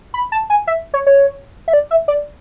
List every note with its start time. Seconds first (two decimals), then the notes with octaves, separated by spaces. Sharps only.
0.14 B5
0.32 A5
0.50 G#5
0.67 E5
0.94 C#5
1.07 C#5
1.68 E5
1.73 D5
1.91 E5
2.08 D5